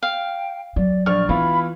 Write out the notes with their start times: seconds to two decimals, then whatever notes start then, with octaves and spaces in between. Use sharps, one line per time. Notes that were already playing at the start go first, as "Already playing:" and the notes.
0.03 F5 G5
0.76 F#3 D5
1.06 A#1 D5 C#6 F6
1.29 E3 B3 E4 F4 B5